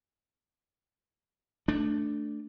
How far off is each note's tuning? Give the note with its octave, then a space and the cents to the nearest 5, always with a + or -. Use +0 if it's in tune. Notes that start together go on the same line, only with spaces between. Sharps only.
A3 +0 D4 +0